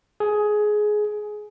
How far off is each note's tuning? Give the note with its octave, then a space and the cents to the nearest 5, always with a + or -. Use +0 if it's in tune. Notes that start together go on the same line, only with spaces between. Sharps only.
G#4 +15